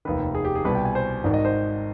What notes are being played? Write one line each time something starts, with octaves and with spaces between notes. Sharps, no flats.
F1 D#2 D#3 B4
G#4
G4
G#4
C2 B2 B4
G5
G#5
C5
G#1 G#2 D#3 D5
D#5
C5